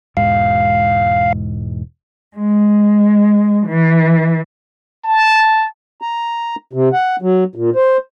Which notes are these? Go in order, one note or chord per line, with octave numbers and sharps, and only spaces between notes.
E1 G#2 F5
G#3
E3
A5
A#5
C3
F#5
F#3
A#2
C5